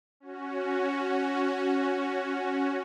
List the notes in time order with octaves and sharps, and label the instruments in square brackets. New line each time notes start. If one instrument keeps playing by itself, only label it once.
[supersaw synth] C#4 F#4